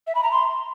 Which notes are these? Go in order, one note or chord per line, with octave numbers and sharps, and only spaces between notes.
E5
B5
A#5
C6